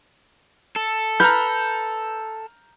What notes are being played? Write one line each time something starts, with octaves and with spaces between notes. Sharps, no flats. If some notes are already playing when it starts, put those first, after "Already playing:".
A4
B4 A#5 F6 G6